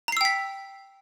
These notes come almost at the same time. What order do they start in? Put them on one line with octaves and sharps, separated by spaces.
A#5 C7 E6 G5 B6